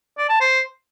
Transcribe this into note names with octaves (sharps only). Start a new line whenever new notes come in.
D5
A5
C5